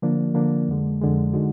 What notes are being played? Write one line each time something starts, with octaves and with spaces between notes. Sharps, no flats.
D3 F3 A#3 D4
D3 F3 A#3 D4
F2 D3 G#3
F2 D3 G#3
D3 G#3 D#4 F#4